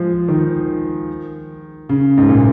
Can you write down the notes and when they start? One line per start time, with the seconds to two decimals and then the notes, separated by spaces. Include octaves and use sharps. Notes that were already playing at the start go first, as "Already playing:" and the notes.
Already playing: F3 G#3
0.29 D#3
1.89 C#3
2.18 G#2
2.29 A#2